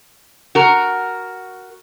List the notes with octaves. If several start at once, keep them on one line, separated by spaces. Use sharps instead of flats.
F#4 A#4